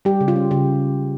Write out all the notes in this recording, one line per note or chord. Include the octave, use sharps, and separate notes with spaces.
G3 G4
C#3
F4
C#4
C#3 G4